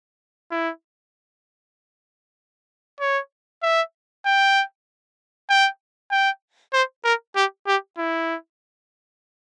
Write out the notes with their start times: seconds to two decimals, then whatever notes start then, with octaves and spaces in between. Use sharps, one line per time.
0.51 E4
3.01 C#5
3.63 E5
4.25 G5
5.50 G5
6.11 G5
6.73 C5
7.04 A#4
7.36 G4
7.67 G4
7.98 E4